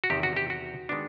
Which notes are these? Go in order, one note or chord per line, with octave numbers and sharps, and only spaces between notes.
F#4
E2 C3 D#3 G4
F#4
G4
F#4
D#3 G#3 B3 D4